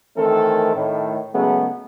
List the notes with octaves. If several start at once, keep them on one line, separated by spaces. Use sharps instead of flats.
D#3 E3 A3 C4 A4 A#4
A2 D#3
C#3 F#3 G#3 A3 B3